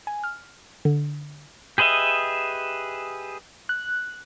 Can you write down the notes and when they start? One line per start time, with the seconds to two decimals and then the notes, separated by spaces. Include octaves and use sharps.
0.07 G#5
0.24 F6
0.85 D3
1.78 G4 G#4 B4 D#5 E5
3.69 F#6